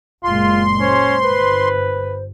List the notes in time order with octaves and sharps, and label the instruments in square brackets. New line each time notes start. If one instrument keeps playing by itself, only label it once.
[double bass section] F#1 A#2 G#3 [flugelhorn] F4 [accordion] C6
[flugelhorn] C#4 [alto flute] C5
[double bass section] G1 [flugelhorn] B4